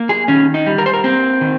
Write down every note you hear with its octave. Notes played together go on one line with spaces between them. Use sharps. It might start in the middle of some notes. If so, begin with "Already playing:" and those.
Already playing: A#3
G#4
D#3 C#4
D#4
G3
A#4
C5
A#4
A#3 C4
D#3